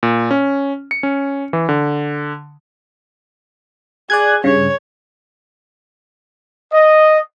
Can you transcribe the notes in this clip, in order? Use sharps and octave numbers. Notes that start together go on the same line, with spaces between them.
A#2
C#4
C#7
C#4
E3
D3
G#4 D5 F#6 G#6
G2 C#3 C#5
D#5